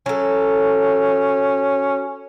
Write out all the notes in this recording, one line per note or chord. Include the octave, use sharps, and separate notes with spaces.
F#3 C#4 A4